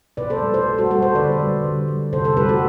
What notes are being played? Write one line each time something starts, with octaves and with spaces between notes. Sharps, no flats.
B2 B4 D5
A4 C5
G3
A4 C5
B2
F#4 A4
G3 F#4 A4
A4 C5
D3 B4 D5
G3
D3
G3
C3 A4 C5
A4 C5
G3 G4 B4
F#4 A4